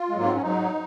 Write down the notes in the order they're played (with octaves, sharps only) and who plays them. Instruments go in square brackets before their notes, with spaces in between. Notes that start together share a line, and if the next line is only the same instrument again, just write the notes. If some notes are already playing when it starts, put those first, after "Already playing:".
Already playing: [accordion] F4
G#3
G#2 F#3 A#3
C4
C#4
G#2 F#3 D#4